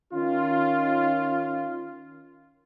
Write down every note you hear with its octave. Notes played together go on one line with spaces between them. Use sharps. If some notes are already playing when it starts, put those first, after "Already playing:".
D#3 C#4 F4